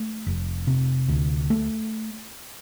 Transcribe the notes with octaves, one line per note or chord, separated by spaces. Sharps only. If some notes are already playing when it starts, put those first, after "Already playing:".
Already playing: A3
F1
C3
D2
A3